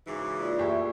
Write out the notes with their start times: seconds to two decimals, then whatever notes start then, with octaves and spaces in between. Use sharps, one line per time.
0.07 G#2 C#3 E3 F#4 D6
0.37 A#3 F4 D5
0.59 A#1 A3 E4 G4 G#4 B4